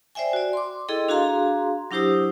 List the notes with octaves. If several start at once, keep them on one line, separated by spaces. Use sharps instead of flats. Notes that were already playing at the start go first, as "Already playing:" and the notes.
C5 D5 E5 G5 G#5
F#4 D5
C6 D6
E4 G#4 A4 D#5 G5
D4 F#4 G#4 F5 A#5 C6
F#3 D4 E4 G4 C5 D#6